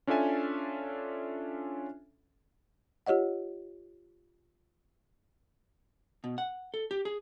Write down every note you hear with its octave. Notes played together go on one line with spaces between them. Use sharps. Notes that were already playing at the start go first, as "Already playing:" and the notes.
C#4 D4 F4 A4 E5 G#5
F4 G4 C#5 D#5 F#5
B2
F#5
A4
G4
G#4